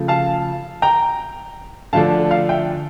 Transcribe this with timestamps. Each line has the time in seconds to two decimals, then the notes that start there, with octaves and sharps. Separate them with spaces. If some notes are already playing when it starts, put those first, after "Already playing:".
Already playing: C#3 F3 A3
0.08 F5 A5
0.82 G5 A#5
1.93 D3 F3 A3 D4 F5 A5
2.31 F5
2.49 E5 G5